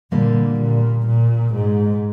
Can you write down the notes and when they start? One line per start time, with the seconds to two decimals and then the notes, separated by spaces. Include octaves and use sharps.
0.12 A#2 D3 G3 A#3
0.59 A#2
1.06 A#2
1.53 G#2